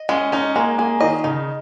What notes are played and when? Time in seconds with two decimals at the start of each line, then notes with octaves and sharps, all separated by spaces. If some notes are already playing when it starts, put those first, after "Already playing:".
Already playing: D#5
0.09 G#3 C#4
0.32 C#4 D#4
0.56 G#3 A#3
0.78 A#3 G#4
1.01 D#3 D#5
1.24 C#3 D#4